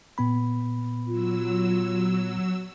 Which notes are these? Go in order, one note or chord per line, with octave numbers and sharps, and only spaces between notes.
A#2 B3 B5
F#3 F4 E6